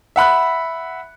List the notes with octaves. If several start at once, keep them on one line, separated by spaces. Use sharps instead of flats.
E5 F#5 B5 F#6